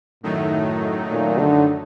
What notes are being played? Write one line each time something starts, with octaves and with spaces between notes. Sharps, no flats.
F#2 A2 D#3 F#3 A3 D#4
A#2
D3